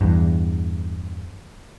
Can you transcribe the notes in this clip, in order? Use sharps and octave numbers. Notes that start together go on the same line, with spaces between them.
E2 G2